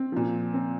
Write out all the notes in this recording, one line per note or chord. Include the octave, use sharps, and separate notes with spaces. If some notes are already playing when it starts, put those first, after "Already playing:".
Already playing: C4
A#2 F3
C4